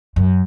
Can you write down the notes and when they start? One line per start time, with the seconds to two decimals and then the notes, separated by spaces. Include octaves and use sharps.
0.16 F#2